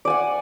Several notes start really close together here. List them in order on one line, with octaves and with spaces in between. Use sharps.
D5 G#5 F#5